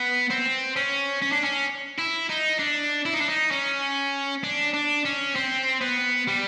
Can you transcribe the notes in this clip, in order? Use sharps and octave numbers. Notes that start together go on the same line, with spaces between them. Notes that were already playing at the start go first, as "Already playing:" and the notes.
Already playing: B3
C4
C#4
C#4
D4
C#4
E4
D#4
D4
E4
D#4
D4
D#4
C#4
D4
D4
C#4
C4
B3
G3